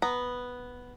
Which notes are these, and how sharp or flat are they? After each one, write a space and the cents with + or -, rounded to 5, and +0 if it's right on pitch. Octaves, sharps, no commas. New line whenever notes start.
B3 +0 A#5 +0